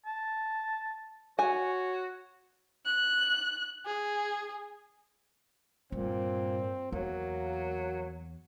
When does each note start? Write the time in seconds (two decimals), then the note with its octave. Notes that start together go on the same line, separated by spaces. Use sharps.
0.06 A5
1.39 F#4 C#5 G#5
2.86 F#6
3.86 G#4
5.92 G2 A#2 C4
6.92 E2 F#3 A#3